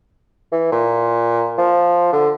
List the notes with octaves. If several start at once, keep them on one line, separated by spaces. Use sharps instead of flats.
E3
A#2
F3
D3